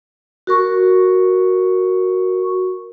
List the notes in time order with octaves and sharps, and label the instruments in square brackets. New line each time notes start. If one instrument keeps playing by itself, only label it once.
[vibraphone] F#4 A#4 C#6